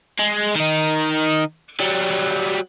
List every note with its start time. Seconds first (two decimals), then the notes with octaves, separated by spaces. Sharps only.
0.19 G#3
0.56 D#3 D#4
1.80 F#3 G3